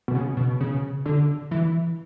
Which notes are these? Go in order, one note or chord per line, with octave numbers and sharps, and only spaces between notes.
B2
C#3
B2
C#3
D3
E3